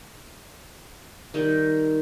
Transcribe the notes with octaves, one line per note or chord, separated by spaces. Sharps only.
D#3 G3 D#4